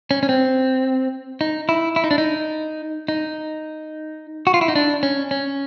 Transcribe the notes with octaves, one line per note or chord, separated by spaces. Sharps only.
C#4
C#4
C4
D#4
E4
E4
D#4
D4
D#4
D#4
F#4
F4
E4
D#4
D4
C#4
C#4